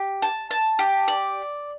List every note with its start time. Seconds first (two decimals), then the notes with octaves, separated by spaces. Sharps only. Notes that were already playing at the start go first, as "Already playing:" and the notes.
Already playing: G4
0.22 A5
0.51 A5
0.79 G4
1.08 D5